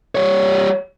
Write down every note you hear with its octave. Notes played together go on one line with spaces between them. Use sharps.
G3 C#5